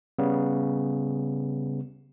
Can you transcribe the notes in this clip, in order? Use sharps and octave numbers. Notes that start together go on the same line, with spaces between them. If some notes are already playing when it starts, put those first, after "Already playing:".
C#3 G3 B3